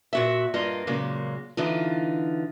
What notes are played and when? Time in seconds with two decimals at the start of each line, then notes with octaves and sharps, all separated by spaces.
0.13 A#2 F#4 E5
0.54 G2 A#3 F4 D#5
0.87 A#2 C#3 F#3 G#3 A#3
1.57 D3 E3 D#4 F4